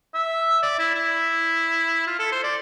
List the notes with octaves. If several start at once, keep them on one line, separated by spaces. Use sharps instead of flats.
E5
D5
E4
E4
F4
A4
C5
D5